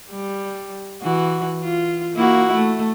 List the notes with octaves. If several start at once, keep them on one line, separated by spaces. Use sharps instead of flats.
G3
E3 F#4
F4
A#3 E4 F#4
A3